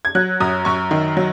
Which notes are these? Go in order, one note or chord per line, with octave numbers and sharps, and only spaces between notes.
G#6
F#3 F#6
F#2 D#6
F#2 C#6
D#3
F#3